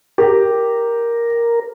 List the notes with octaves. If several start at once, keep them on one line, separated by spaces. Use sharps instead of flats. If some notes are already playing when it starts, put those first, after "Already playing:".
G4 A#4